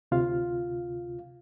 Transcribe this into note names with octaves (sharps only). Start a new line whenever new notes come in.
D2 C3 F4 F5